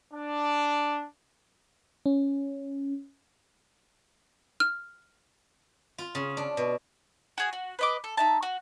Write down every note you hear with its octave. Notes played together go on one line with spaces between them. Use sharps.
D4
C#4
F6
F4
C#3
D4
B2
F#4 G#4 G#5
F#4
B4 D#5 D6
A4
D#4 E5 A5
F#4